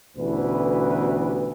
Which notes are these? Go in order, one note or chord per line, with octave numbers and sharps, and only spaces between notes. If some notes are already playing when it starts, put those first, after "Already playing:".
A1 D2 B2 E3 E4 B4